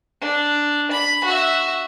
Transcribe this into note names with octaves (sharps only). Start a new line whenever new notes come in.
D4
B5
F#4 E5